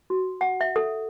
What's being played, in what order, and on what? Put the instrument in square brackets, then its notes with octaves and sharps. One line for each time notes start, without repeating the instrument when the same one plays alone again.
[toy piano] F#4
F#5
E5
A4